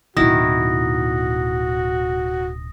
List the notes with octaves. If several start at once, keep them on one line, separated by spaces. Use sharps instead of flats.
D1 B2 D#3 E4 F#4 D#6 A#6